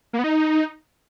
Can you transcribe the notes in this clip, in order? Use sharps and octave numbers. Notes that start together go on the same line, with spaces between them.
A#3
B3
D#4